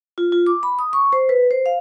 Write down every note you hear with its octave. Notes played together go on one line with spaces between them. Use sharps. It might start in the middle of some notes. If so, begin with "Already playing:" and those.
F4
F4
D6
B5
D#6
C#6
C5
B4
C5
F5